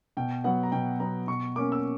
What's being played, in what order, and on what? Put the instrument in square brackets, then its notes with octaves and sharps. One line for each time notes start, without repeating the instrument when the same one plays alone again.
[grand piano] B2 G5
F#3 B3 F#5
A#5
B2 G5
F#3 B3 A#5
B2 C#6
A#3 C#4 D6
E6